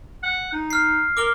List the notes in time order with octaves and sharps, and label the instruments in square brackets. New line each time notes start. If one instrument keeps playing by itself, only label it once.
[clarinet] F#5
D#4
[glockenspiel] F6 C7
[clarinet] A#4 [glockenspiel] D6 F6 G7